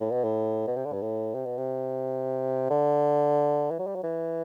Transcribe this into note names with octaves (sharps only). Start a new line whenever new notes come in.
A2
B2
A2
B2
C3
D3
G2
A2
C3
B2
C3
D3
E3
F#3
G3
F#3
E3